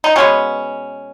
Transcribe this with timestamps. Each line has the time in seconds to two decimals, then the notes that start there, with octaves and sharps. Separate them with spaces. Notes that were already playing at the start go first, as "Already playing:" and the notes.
0.04 D#4
0.16 B2 G#3 B3 C#4